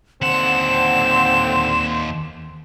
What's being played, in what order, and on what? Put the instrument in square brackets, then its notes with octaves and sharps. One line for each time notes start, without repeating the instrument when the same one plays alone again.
[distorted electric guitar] D#2 F#5 [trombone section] D3 C4 [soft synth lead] C6 [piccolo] E7